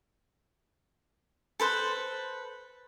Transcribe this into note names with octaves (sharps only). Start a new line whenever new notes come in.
A4 B4 C5